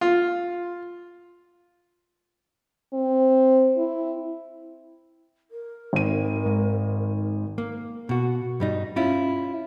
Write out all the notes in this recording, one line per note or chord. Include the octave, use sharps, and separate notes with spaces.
F4
C4
E4
A#4
G#1 D#7
G#2
A#3
B2 F#4
G2 G3 D#4
C#4 E4 F4